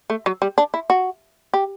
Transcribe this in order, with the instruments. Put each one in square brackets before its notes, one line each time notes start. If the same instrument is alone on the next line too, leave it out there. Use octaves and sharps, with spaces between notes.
[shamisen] A3
F#3
G3
D4
E4
F#4
G4